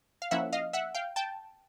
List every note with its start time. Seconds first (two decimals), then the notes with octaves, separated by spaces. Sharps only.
0.22 F5
0.31 F3 A#3 C#4 E4 E5 F#5
0.53 D#5 F5
0.73 E5 F#5
0.94 F5 G5
1.16 G5 A5